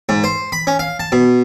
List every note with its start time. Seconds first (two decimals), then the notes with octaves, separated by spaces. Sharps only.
0.09 G#2
0.24 C5
0.52 B5
0.67 C#4
0.79 F5
1.00 A5
1.12 B2